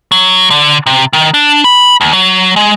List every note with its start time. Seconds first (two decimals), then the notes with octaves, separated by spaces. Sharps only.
0.12 F#3
0.50 D3
0.86 C3
1.13 D#3
1.34 D4
1.64 B5
2.01 D#2
2.13 F#3
2.56 G#3